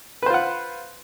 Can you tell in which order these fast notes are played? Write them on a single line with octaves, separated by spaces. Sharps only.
B4 C5 F4 F#5